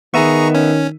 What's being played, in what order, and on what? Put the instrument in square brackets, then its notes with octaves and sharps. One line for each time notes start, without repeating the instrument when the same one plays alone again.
[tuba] D#3 [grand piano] B3 E5 D#7 [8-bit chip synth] G#4 A#5 C#6
[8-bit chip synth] C#4